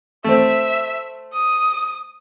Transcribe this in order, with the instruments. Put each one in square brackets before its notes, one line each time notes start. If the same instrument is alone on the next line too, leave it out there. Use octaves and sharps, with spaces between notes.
[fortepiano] A3 C4 [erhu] E5
[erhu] D#6